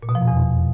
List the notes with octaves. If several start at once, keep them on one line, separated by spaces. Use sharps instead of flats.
A#2
B2
F3
F2
E2